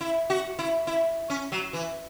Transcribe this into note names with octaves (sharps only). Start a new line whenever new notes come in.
E4
F#4
E4
E4
C#4
F#3
E3